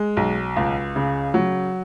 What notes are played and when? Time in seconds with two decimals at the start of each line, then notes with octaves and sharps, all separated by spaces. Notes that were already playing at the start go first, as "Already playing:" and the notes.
Already playing: G#3
0.17 B1
0.56 C#2
0.96 C#3
1.34 F#3